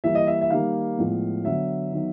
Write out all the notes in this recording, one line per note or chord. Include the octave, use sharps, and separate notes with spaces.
E3 G3 A#3 E5
D#5
E5
E5
D#3 G3 A#3 F5
A2 F3 G#3 B3
D3 F#3 B3 E5
D#3 F#3 B3